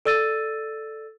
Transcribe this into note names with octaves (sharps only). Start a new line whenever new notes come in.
A4 D5 E6 A6 D#7